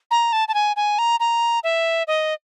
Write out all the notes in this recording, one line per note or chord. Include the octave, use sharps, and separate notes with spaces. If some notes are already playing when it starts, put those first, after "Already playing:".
A#5
A5
A5
G#5
G#5
A#5
A#5
E5
D#5